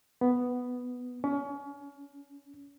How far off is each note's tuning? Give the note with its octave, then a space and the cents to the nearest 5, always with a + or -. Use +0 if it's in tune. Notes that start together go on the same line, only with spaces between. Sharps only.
B3 +5
C#4 +30